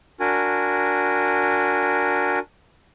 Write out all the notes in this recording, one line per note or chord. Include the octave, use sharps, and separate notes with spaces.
D4 F#4 A#4 G#5